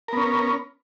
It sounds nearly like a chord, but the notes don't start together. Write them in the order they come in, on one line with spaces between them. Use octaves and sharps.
A#4 B3 C#4